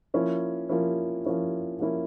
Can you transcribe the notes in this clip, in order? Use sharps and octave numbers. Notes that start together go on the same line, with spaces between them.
F3 A#3 C#4 E4
F3 A#3 C#4 E4
F3 A#3 C#4 E4
F3 A#3 C#4 E4